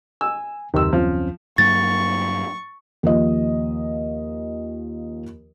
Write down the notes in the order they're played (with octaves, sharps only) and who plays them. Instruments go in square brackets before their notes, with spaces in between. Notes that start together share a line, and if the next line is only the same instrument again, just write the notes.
[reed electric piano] G#5 [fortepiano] E6
[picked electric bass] F#1 D#2 F#3 [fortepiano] C3 E6 [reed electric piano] D#3
[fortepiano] F3 [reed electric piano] C4 C#4
[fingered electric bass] G2 F#3 A#3 [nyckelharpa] C#6 [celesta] A6
[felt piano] D#2 F3 D#5